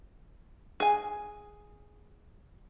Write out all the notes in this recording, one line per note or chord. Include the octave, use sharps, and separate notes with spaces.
G#4 G#5